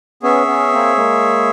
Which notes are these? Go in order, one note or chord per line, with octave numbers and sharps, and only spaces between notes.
B3 C#4 G#4 C#5 E5
B3 C#4
A#3 C4
G#3 A#3